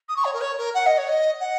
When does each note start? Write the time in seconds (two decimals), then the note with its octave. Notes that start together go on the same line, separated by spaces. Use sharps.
0.09 D#6
0.16 C#6
0.25 C#5
0.33 A#4
0.41 C#5
0.58 A#4
0.74 F#5
0.86 D#5
0.97 C#5
1.08 D#5
1.40 F#5